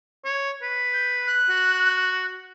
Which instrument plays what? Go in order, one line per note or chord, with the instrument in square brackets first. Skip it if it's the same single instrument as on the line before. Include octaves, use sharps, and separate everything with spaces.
[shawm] C#5
B4
[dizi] G6
F#6
[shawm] F#4